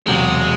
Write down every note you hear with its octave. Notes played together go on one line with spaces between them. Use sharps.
E1 E2 C3 F#3 G#3